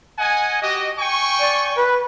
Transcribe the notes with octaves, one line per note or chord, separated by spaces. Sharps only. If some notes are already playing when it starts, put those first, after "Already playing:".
D#5 F#5 G#5
F#4 G4 D#5
G5 G#5 C#6
D5
B4